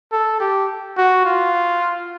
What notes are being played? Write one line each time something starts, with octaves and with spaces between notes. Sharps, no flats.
A4
G4
F#4
F4